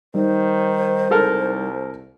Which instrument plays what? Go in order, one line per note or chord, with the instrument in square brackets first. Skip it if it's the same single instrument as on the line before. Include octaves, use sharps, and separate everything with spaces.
[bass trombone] D#3 [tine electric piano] G3 D#4 [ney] C5
[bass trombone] C2 [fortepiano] G#3 A4 A#4